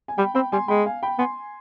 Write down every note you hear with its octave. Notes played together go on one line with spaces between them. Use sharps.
G#5
G3 G5 B5
C4 G5 B5
G3 G#5 C6
G#3 G5 B5
F5 G#5
G5 B5
B3 G#5 C6